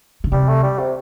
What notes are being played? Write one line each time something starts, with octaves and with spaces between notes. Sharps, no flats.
D3
C3 G3
A3
G3
C3